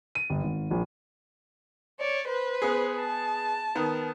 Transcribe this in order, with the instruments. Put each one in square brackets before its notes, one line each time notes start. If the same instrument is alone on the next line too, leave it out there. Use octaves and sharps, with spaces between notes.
[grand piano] D#7
G1
G#1
A#1
[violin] C#5 D5
B4 C5
[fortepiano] B3 G#4
[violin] A5
[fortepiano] D#3 B3